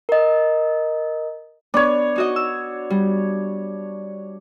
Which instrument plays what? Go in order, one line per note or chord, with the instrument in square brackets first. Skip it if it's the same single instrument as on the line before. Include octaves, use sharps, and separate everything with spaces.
[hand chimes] A#4 D#5
[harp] B3 [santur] D4 C#5
[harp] D#4 F#4 D#5
E6
G3